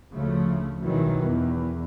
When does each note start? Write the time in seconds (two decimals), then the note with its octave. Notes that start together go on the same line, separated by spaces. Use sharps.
0.13 D2 C#3 F3 A3
0.82 B1 B2 D#3 E3 F#3 G3
1.23 E2